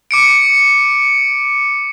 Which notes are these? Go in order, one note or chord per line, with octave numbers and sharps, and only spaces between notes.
D6 C#7 D7